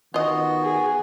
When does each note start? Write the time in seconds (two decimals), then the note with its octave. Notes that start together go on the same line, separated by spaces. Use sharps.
0.14 D#3 B3 F4 F#4 D#5
0.63 G#4